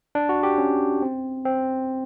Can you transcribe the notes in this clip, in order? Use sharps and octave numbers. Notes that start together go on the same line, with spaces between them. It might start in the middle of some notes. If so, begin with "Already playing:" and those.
D4
F#4
G4
C#4
C4
C4